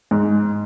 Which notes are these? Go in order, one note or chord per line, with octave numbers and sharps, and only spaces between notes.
G#2